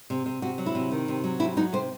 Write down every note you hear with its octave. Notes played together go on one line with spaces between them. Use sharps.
C3
C3
C3 F#4
F#3
E4
C3
D#3
C3
F#3
C3 E4
F#3 D#4
C3 C5